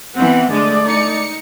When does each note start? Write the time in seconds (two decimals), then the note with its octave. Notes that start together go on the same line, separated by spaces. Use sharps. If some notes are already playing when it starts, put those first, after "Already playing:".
0.16 E3 B3 C4 F#5
0.50 D3 G#3 A3 D5
0.86 D#4 C#7